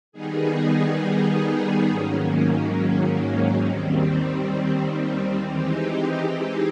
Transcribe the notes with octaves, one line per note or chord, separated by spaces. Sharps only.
D#3 G3 B3 D#4 G#4
G#2 D#3 F#3 A#3 C#4
D#2 D#3 G3 C4
E3 G#3 C4 D#4 G4